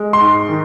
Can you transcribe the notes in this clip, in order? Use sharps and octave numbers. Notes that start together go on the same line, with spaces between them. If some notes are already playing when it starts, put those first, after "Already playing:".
Already playing: G#3
C6
G#2
D#3